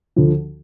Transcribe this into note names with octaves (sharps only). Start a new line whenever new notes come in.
D2 D3 F3